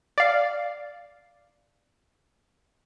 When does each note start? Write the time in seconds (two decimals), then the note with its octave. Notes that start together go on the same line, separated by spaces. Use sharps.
0.18 D5 F5